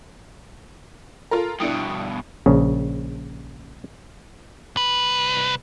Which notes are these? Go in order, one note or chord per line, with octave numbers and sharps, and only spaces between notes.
F4 A4 A#4
G2 B2 D4 E4 D#6
A#1 C#3
C2 B4